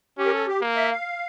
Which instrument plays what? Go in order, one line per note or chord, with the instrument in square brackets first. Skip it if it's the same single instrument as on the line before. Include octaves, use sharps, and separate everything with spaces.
[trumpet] C#4 [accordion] G4
[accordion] A#4
A4
G4
[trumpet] A#3
[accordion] E5
F5